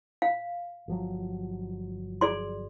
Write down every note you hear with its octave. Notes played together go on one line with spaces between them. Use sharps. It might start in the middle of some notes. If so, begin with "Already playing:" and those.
F5
G1 F3 F#3
G#4 D5 C6